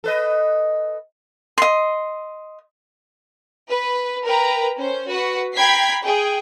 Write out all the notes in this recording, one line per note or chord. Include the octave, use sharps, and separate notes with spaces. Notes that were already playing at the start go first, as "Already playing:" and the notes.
A4 B4 D#5
D#5 C6
B4
A#4 B4 G5 A#5
C#4 C5
F#4 B4 F#5
G5 A#5 B5 G#6 B6 C7
G#4 G5